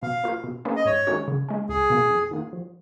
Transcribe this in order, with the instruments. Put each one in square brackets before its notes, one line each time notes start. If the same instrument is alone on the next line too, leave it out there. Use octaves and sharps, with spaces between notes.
[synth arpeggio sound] B2 [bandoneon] F5
[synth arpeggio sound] A#3 F4 B4
B2
A#3 C#4 G#4 B4
[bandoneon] D#5
[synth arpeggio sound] G#2 [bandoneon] C#5
[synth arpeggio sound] D#3 G#3 C#4 F#4
C#3
G#3 C#4
[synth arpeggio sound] C#2 [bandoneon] G#4
[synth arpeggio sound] B2 A#3
F2
D#3 A#3 F4
F3